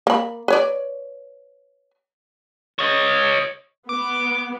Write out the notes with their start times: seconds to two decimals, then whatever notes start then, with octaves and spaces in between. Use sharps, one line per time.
0.07 A#3 B5
0.48 B4 C#5 D5
2.79 C#5 D#5
3.89 B3 D6